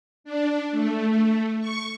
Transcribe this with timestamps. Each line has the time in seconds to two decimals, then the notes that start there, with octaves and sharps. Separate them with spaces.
0.24 D4
0.71 A3
1.60 C#6